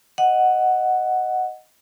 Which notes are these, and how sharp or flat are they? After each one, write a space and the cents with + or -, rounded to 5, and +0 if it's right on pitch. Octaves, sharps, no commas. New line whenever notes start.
D#5 +0 F#5 +0